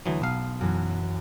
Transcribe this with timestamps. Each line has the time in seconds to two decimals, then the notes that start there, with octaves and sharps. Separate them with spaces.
0.06 D2 E3 F#3 C6 D#6
0.22 B1 F5
0.61 F#2 E3